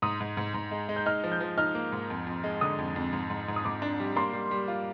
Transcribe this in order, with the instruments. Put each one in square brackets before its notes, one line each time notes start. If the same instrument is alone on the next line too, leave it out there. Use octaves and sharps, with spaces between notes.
[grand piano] G#2 [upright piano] D#6
[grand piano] G#2
G#2
G#2
G#3
G#3
[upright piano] G6
[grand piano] D#4 [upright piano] F6
[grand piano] F3
[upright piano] G6
[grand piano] F3
[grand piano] D#4 [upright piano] F6
[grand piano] A#3
G#2
F2
F2
G#3
[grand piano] D3 [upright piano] D#6
[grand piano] F2
F2
G#2
G#2
G#2
[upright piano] D#6
[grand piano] G#2 [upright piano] D6
[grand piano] D4
G3
[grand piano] A#3 [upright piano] C6
[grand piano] G3
G3
F4